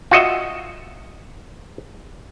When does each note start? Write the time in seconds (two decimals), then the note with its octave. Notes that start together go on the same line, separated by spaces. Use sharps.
0.11 F4 F#4 D#5 E5